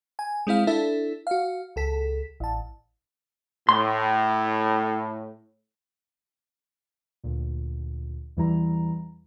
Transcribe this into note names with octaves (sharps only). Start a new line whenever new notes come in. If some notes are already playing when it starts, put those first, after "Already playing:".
G#5
G#3 C4 E4 F5
D4 E4 A4 E5
F#4 F5
C#2 A4 B6
A1 A5
A2 C6
D2 A#2
E2 E3 G3 E4 A#5